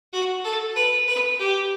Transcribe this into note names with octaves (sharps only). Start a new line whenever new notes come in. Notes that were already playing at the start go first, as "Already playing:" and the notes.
F#4
A4
B4
B4
G4